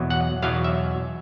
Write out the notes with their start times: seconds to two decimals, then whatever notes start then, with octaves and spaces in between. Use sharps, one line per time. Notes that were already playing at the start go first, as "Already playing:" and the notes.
Already playing: E2 B2 F#3
0.10 F#5
0.42 E2 B2 F#3 F5
0.64 E5